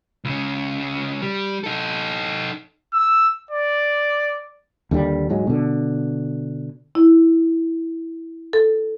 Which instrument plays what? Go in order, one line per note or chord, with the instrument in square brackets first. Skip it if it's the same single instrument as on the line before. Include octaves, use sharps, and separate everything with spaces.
[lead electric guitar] C#2 C#3
G3
D#4 A4
[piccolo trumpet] E6
D5
[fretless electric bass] D#2 D3 G3
G#2 F#3 G#3
B2 D3
[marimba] E4
A4